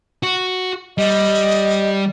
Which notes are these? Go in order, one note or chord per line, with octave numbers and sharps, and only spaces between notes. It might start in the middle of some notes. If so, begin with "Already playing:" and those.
F#4
G3 D#5